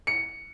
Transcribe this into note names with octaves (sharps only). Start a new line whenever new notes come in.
C#7